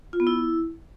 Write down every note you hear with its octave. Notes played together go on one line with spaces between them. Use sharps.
F4
B3
E4